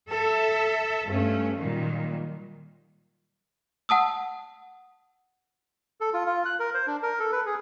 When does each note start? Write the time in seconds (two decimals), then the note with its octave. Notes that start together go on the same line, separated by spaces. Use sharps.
0.10 A4 E5
1.07 G2 A3 C#4
1.56 A#2 D#3 F#3 G3
3.89 F#5 A5 D#6 E6
6.01 A4
6.14 F4
6.26 F4
6.45 F#6
6.60 A#4
6.74 C5
6.87 D4
7.02 A#4
7.20 A4
7.32 B4
7.46 G#4